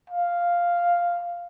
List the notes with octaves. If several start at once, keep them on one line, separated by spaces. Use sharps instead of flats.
F5